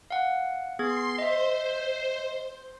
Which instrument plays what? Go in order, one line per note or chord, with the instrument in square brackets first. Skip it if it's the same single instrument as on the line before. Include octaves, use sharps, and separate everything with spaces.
[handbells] F5 F#5
[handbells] B3 G#4 G#6 [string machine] C6 C7
[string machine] C5 [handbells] D#5 E5